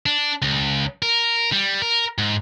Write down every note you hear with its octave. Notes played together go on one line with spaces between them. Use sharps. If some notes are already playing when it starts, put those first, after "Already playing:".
D4
C#2
A#4
G3
A#4
G#2